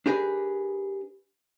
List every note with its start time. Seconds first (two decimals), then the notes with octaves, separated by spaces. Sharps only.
0.06 D4 G4 G#4 A#4 B4